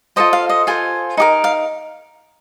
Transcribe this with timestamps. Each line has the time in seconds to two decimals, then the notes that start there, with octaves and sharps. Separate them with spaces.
0.16 F4 A4 C5 D#5
0.33 F5
0.49 D#5
0.67 F4 A4 C5 G#5
1.17 D#4 G4 A#4
1.44 F5